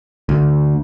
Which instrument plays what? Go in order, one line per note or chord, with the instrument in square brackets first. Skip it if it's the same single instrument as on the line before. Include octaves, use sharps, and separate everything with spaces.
[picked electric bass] D2